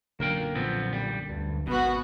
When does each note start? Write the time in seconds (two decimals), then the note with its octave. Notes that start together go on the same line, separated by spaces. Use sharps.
0.20 B1 F#2 A#2 D3 A#3 A#4 G5
0.55 A#2 F3 B3 C4
0.93 G3
1.29 D2 G2
1.67 G#1 B2 B3 F#4